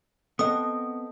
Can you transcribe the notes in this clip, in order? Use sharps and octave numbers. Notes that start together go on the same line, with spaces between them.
B3 C4 A4 D#5 F#5 D#6